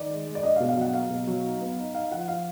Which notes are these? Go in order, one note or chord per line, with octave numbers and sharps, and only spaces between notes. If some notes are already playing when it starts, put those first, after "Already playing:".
Already playing: D#3 D5
G#3
G#3
D5
D4 D#5
F5
B2
F5
F#3 F#5
A#3 F5
B2
F#3
D#4
B3
D#4
D#4 F5
F3 F#5
F3 F5